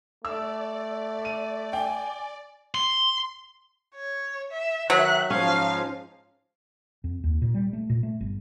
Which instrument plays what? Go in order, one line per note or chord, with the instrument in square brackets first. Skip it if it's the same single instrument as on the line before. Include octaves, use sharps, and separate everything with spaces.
[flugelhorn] A3 [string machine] D5 [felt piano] E6
[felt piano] D#7
[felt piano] G5 [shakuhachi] G#5
[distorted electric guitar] C6
[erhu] C#5
E5
[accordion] D#3 E5 [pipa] F#3 [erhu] F#6
[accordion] G#2 F3 [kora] C#4 [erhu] F5
[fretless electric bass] F2
D#2
A#2
G3
A3
A#2
A3
G1